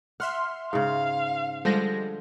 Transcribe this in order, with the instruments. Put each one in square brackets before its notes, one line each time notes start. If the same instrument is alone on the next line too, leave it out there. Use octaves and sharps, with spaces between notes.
[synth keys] E5 C6 F6 [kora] F#5
[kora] G#2 C#3 [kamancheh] F5
[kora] D3 F3 C5 [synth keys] G3 G#3 A#6